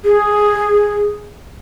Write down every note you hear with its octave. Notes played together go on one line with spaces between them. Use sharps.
G#4